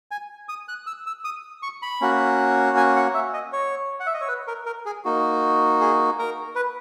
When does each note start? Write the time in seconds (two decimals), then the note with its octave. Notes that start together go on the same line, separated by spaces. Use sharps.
0.11 G#5
0.49 D#6
0.68 F#6
0.87 E6
1.06 E6
1.24 D#6
1.62 C#6
1.82 B5
2.01 A#3 C#4 F#4
2.77 G#5
2.96 F#5
3.14 E5
3.34 D#5
3.53 C#5
4.00 F#5
4.06 E5
4.14 D#5
4.21 C#5
4.28 B4
4.48 A#4
4.66 A#4
4.86 G#4
5.04 A#3 D#4 F#4
5.81 G#4
6.19 A#4
6.56 B4